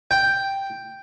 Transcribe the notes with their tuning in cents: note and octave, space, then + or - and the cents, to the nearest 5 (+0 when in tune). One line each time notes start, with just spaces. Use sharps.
G5 +0